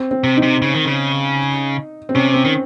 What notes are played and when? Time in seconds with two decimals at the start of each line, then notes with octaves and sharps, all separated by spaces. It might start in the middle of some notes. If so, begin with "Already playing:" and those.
Already playing: C4
0.11 C4
0.24 C3
0.37 D#4
0.43 C3
0.62 C#3
0.74 D#3
0.85 C#3
2.09 C4
2.15 C3 C#4
2.34 C4
2.45 D#3